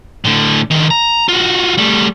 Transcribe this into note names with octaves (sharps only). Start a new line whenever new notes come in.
A2 D3
D3 D#3
A#5
F4 F#4
G3 A3